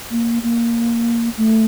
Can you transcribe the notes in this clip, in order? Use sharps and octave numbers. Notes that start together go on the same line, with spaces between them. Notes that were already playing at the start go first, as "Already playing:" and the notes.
A#3
A#3
A3